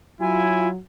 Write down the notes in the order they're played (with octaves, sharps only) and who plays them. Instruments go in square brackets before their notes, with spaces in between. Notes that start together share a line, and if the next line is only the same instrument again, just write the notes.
[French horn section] F#3 [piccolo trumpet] E4 [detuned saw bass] F4 [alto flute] G#5